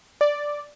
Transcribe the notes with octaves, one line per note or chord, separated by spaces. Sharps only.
D5